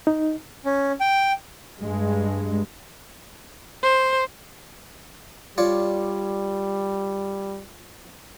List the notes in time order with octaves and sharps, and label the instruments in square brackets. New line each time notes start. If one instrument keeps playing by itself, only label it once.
[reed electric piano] D#4
[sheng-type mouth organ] C#4
G5
[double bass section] G2 G#3
[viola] C5
[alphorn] G3 [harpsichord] F4 C#5 D5